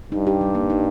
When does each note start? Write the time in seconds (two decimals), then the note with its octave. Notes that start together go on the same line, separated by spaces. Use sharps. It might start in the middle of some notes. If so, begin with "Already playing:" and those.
0.12 G2 D#4
0.27 G4
0.41 G3
0.55 A#3
0.70 D#4